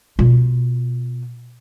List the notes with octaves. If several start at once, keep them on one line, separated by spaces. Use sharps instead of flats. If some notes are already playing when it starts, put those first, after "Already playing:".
B2 F4